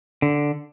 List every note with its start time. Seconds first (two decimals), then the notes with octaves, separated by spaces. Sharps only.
0.22 D3